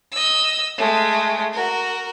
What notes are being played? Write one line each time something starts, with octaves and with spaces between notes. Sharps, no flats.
D#5 E6
G#3 A3
F#4 A#4